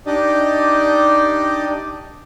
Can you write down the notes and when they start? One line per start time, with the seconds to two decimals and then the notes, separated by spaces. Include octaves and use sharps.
0.06 D4 D#4 G4 D5 D#5